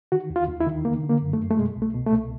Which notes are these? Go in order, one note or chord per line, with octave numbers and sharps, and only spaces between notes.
D#3 F#4
D#2
F4
D#2
E4
D#3
D3 A#3
D3
A#3
F#2
A3
F#2
A3
B2 G#3
C2
A3
B2
A3
C2